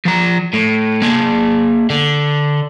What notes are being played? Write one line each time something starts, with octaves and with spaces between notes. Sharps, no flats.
F3 A#5
A2
A#3 G#4
D3